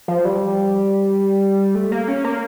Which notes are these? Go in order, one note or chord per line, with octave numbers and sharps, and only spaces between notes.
F3
G3
A3
A#3
C#4
A#3